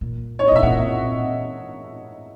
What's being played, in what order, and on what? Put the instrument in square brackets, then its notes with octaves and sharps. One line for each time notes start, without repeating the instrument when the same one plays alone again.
[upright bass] A#2
[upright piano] C#5
D#5
[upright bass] B2 [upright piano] E5
[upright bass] A#2 [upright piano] F#5